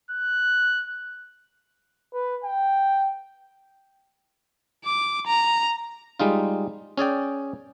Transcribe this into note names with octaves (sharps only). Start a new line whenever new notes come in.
F#6
B4
G5
D6
A#5
G3 G#3 D#4 F4
C#4 G#4 D5 G5